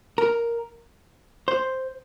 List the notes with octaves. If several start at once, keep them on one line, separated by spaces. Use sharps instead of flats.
A#4
C5